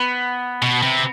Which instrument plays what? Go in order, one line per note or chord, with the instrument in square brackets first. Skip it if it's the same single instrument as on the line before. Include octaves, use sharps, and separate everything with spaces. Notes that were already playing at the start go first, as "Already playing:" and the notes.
Already playing: [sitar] B3
[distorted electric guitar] B2
C3